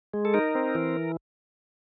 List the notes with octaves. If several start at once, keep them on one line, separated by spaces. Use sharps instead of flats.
G#3
A4
D#4 A#4
C4
E3